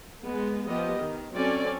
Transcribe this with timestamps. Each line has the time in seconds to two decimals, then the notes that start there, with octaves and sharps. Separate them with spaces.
0.22 G#3 B3
0.66 F3 B3 G4 D#5
0.98 D#3
1.33 F#3 C4 C#4 A4 D5